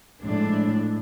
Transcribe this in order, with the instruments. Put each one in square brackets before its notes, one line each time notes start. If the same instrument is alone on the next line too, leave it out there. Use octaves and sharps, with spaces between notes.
[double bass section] A2 [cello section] F3 G#3 D4